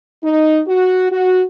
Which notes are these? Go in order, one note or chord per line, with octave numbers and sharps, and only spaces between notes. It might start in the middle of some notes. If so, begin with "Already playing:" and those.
D#4
F#4
F#4